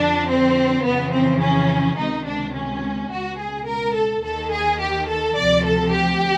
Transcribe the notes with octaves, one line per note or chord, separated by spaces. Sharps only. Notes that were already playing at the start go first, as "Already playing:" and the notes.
Already playing: F2 D3 F3 D4
C4
F2 C#3 E3 B3
C4
C#4
C#2 C3 D#3 D#4
D4
C#4
C#2 B2 F#4
G#4
A#4
A4
D#2 D#3 A4
G#4
G4
A4
D2 C3 F3 D5
A4
G4